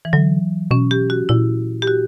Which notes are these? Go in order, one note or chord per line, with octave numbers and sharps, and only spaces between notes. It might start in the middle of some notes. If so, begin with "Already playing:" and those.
E3
D3 F#3
B2 C#4
G4
F#4
A#2 E4
G4
F#4